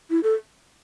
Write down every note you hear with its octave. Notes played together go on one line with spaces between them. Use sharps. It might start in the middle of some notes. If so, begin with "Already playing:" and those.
E4
A4